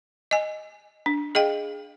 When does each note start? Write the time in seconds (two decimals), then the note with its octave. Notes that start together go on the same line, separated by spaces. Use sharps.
0.31 D#5 G#5
1.06 D4
1.35 G#4 D#5 F5 G5